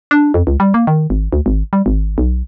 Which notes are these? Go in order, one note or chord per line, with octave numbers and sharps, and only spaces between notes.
D4
F2
C#2
G3
A#3
D#3
G#1
D2
G#1
G3
G#1
B1